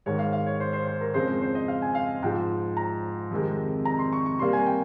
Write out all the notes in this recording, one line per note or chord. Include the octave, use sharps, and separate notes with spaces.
G#2 D#3 G#3 C#5
F5
F5
C#5
C5
C5
C5
A#4
F2 C#3 G#3 C5
C5
D#5
F5
G#5
F5
G#2 F3 G#3 G5
A#5
F2 C3 D#3 G#3
A#5
C6
C#6
C#6
C3 G3 A#3 C6
G#5
G5